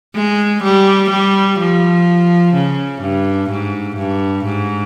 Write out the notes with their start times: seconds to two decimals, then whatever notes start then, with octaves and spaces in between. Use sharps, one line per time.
0.15 G#3
0.62 G3
1.10 G3
1.59 F3
2.54 C#3
3.01 G2
3.49 G#2
3.96 G2
4.45 G#2